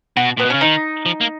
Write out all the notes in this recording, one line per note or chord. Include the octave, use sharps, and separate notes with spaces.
B2 F#4
A#2 B3
B2
C#3 C#4
D#3 D#4
F3
A#3